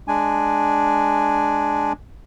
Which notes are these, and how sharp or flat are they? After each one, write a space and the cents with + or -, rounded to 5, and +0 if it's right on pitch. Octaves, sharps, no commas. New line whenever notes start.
G#3 +0 D4 +0 G#5 +0